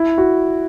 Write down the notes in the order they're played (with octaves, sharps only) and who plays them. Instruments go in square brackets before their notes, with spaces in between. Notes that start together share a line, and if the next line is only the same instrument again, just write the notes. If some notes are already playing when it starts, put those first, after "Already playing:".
Already playing: [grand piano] E4
F#4